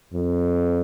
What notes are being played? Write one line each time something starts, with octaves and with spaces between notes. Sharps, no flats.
F2